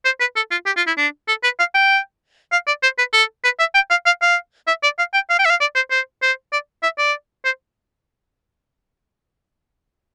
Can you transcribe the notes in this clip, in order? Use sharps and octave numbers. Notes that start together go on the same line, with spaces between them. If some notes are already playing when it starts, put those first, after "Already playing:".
C5
B4
A4
F4
G4
F4
E4
D4
A4
B4
F5
G5
F5
D5
C5
B4
A4
B4
E5
G5
F5
F5
F5
E5
D5
F5
G5
F5
G5
E5
F5
D5
C5
C5
C5
D5
E5
D5
C5